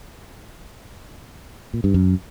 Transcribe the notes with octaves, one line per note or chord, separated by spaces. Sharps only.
A#2
G2
F#2